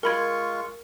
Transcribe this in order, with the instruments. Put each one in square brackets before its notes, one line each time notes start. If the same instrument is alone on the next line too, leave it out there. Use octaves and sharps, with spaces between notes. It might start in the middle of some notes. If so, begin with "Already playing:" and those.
[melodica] G#3 F4 C#6 [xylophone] A#4 B5 G#6